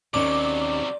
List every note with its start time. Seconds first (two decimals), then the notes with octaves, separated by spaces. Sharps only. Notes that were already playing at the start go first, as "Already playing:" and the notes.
0.14 D#2 C3 F#3 C#4 D#4 D5 D6